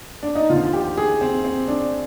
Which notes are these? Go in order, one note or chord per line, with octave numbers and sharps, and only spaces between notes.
D4
D#4
D#2 D3 F3 F4
G4
G#4
C4
C4
D4